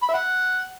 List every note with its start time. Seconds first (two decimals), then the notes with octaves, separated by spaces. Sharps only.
0.03 B5
0.08 E5
0.14 F#5